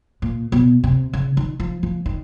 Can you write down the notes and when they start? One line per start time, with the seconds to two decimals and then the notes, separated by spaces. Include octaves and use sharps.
0.22 A#2
0.52 B2
0.84 C3
1.13 C#3
1.37 D#3
1.60 F3
1.83 F3
2.06 D#3